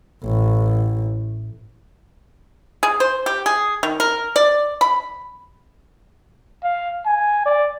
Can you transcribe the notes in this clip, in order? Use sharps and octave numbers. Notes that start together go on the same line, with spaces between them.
A1
G#4
C5
G4
G#4
D#3
A#4
D5
B5
F5
G#5
D5